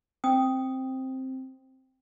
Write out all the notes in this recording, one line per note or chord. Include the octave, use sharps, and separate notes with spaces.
C4 G5 D#6